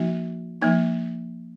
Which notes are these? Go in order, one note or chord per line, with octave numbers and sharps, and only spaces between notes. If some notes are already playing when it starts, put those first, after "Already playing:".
Already playing: F3 A#3 D#4 F#4
F3 A#3 D#4